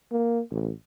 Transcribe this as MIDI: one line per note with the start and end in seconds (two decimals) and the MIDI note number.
0.11 0.40 58
0.51 0.72 33